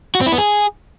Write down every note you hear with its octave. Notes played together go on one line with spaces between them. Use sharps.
F#4
C4
E4
B3
G#4